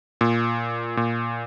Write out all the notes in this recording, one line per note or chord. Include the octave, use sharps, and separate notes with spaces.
A#2
A#2